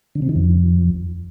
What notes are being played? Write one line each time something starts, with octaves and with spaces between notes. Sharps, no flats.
D3
C3
D#3
F2